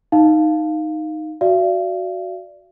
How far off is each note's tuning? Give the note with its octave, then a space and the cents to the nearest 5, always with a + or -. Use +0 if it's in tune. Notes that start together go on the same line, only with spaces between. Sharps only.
D#4 +0 F5 +0
F#4 +0 D5 +0 F5 -45